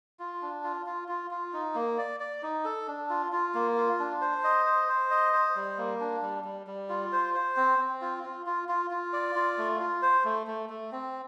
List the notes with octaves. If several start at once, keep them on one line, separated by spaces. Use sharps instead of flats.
F4
D4
F4
F4
F4
F4
D#4
A#3
D5
D5
D#4
A4
D4
F4
F4
A#3
F4
D4
C5
D#5
C5
C5
D#5
C5
G3
A#3
D4
G3
G3
G3
F4
C5
C5
C4
C4
F4
F4
F4
F4
F4
D5
F4
A3
F4
C5
A3
A3
A3
C4